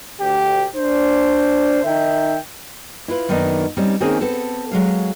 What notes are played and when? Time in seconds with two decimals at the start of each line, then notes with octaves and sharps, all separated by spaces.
0.20 D2 G4
0.75 D4 C5
1.84 D#3 D#4 E5 G5
3.08 E4 F4 B4
3.29 F#2 D#3 A#3 B3 D4 D#4
3.77 G3 C4 C#4 D#4
4.00 D#3 A#3 C4 C#4 G#4
4.21 B3 C4 A4
4.71 F#3 G#3 F5